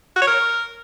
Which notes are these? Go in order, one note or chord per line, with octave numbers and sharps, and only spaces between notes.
F#4
C#5
A#4